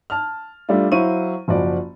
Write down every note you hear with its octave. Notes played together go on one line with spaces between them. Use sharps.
A5 F6
G3 A3 D4 F4
F#3 E4 C5 F5 C#6 D#7
F#1 F3 F#4 D5